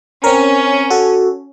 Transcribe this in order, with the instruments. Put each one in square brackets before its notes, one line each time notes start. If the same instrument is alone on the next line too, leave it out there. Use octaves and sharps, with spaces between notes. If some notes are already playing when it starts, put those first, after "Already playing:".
[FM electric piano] C4 A#4 [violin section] C#4
[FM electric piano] F#4 A4